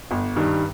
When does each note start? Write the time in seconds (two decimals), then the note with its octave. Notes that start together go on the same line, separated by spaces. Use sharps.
0.11 G1
0.36 G2 D#3 G3